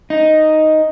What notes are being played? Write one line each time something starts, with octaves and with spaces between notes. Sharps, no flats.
D#4